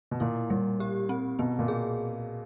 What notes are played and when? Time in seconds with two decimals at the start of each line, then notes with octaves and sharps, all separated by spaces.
0.11 B2
0.20 A#2 E4
0.50 A#2 G3
0.80 G4
1.09 C4
1.39 B2 B3
1.59 A#2
1.68 G#4